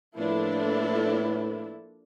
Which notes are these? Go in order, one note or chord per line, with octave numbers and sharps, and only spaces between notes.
A2 F3 A#3 D4 E4 A4 B4